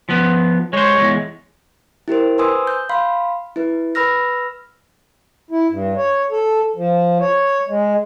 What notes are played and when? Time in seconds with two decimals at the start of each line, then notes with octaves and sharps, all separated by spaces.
0.09 F3 B3
0.73 G#3 C5 C#5
0.98 E2 G#3
2.08 E4 G4 A#4 C5
2.38 B4 C5 G#5 C6 D#6 E6
2.67 G6
2.89 F5 B5 C6
3.56 E4 B4
3.95 B4 B5 E6 F6 A#6
5.51 E4
5.70 G2
5.97 C#5
6.31 A4
6.76 F3
7.20 C#5
7.68 G#3